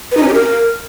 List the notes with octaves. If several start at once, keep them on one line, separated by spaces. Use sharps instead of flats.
B4
D#4
C#4
G4
A#4